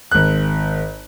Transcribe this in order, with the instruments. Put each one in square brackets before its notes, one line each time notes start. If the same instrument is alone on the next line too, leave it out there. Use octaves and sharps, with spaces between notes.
[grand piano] G#1 F#6